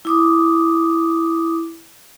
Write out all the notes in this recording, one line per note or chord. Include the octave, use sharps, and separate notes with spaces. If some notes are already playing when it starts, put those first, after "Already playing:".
E4 D6 D#6